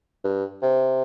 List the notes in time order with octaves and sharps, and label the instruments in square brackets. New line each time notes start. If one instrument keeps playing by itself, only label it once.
[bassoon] G2
C3